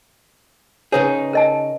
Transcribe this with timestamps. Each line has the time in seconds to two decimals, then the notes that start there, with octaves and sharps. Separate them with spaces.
0.92 C#3 D#4 G#4 A#4 B4 C#5
1.33 A#4 D#5 A5